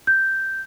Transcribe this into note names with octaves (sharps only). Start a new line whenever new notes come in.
G6